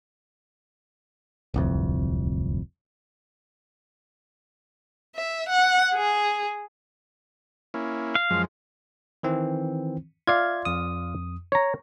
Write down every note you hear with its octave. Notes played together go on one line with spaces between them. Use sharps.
D1 C2 F2
E5
F#5
G#4
A#3 C#4 E4
F5
F#2 F3 G#3
D#3 E3 C4
F4 D5 E5 F5 G#6
F2 D#6
C#5 A#5